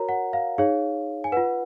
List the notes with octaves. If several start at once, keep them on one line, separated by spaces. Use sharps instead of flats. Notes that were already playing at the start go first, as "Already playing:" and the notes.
Already playing: F#4 A#4 C#5 A#5
F#5
F5
D#4 G#4 C#5 F5
G#5
F4 B4 F#5